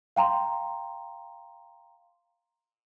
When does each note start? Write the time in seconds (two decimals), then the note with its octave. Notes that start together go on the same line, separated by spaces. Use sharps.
0.16 F5 G5 A#5 C6